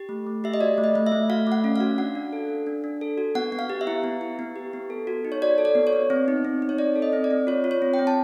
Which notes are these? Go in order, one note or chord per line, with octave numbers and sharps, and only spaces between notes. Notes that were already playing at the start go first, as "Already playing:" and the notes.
Already playing: G4
A3
A3
G4 E5
D#5
F#4 D5
A3
D#5
A3
E5
A3
F#4 F5
A3 F#5
C#4
F5
F#4
D4 F#5
D4
A4
D4
D4
D4
A4
F#4
B3 F#5
B3
F5
G4
E5
E4
B3
E4
B3
G4
B3
A4
F#4
D#4
C#5
F#4 D5
A4
D5
B3
C#5
B3
C4
D#4
C4
D#4
C#5
C4 D5
A4
D#5
C4
D5
C4
F4 C#5
F4
C#5
C4
G5
C4
A5